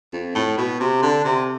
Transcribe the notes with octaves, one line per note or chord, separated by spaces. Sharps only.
F2
A2
B2
C3
D3
C3